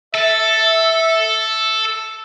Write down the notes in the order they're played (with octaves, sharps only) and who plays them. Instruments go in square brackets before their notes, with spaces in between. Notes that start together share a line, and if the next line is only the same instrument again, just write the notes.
[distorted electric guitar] A4 [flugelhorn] E5